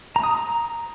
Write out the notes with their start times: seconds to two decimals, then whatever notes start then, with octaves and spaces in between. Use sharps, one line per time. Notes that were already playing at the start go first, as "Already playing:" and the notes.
0.16 A#5
0.23 D#6
0.31 A#5